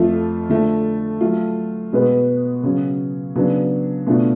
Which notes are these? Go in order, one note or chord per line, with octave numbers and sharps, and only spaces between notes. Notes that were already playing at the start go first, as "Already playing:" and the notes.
Already playing: F2 F3 A3 F4
D3 F3 A3
F#3 A3 F4
B2 G#3 B3 F#4 B4
C#3 F#3 C#4
C#3 F#3 B3 D4
B2 A3 D4 F4